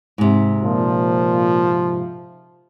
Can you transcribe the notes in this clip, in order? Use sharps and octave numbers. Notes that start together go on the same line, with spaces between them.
G#2 C3
A#2 F3